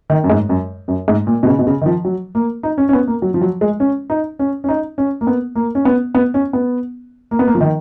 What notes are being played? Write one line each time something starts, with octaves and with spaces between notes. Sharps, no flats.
D#3
F#2
G#2
F#2
F#2
G#2
A#2
B2
C#3
B2
C#3
D#3
F3
F#3
A#3
D#4
C#4
C#4
B3
A#3
F#3
F3
F#3
G#3
C#4
D#4
C#4
C#4
D#4
C#4
A#3
B3
A#3
C#4
B3
B3
C#4
B3
A#3
B3
A#3
F3
D#3